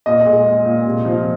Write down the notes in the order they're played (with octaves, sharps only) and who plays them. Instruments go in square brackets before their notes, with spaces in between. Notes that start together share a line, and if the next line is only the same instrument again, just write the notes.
[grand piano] A#2 D#5
G#3
G#3
A#2
C3
F3